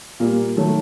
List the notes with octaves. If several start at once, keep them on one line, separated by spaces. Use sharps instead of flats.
A#2 G3 A#3
D#3 F#3 A3